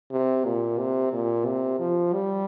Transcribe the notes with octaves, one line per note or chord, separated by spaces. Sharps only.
C3
A#2
C3
A#2
C3
F3
G3